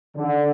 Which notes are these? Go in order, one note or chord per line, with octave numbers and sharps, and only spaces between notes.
D3